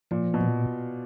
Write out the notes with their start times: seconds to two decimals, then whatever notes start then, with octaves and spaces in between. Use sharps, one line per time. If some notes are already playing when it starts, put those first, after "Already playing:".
0.11 A#2 F3
0.34 B2
0.41 A#2